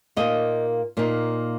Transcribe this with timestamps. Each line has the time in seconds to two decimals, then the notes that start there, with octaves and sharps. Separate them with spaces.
0.16 A#2 A#3 D#4 D#5
0.97 A#2 A#3 D#4